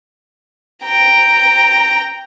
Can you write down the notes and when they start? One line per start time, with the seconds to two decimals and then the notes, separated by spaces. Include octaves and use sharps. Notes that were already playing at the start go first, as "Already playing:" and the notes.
0.83 G5 A#5